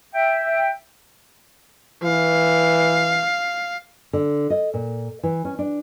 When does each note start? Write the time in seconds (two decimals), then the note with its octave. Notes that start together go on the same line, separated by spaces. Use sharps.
0.13 E5 G5
2.04 E3 F5
4.13 D3
4.50 D#5
4.74 A#2
5.23 E3
5.45 C#4
5.59 D4